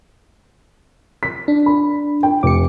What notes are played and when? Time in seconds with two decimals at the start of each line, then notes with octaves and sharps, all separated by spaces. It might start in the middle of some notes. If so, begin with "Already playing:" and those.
1.23 B6
1.48 D4
1.66 B5
2.23 G5
2.43 F1 D6 C#7